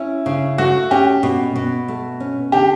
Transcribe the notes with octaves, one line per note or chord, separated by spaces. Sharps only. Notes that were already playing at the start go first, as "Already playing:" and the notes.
Already playing: C#4 E4
C#3
A3 F#4
C#4 G4
B2
B2
A3
C#4
D3 G4